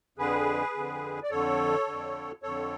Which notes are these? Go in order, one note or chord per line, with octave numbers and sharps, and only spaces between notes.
F2 D3 G#4 B4
F2 D3
D5
F2 D3 A4 C#5
F2 D3
F2 D3 A4 C#5